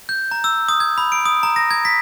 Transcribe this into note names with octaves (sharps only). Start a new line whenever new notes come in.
G6
A#5
E6
D#6
G#6
B5
D7
D#6
A#5
A#6
G#6
B6